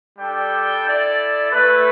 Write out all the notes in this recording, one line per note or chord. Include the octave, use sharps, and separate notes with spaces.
G3 D4 A4 D5 G5
E4 A4 D5
A3 E4 B4